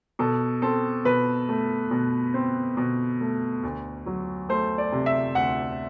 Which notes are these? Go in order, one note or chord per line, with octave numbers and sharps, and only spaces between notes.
B2 A4
C4 A4
B2 B4
A3
B2
C4
B2
A3
D2
F#3
A3 C5
D5
C3
E5
D2 F#5